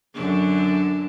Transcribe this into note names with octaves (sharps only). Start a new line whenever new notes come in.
F#2 D3 D4